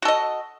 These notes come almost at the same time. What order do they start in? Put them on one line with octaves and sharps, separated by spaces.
F#4 A4 D#5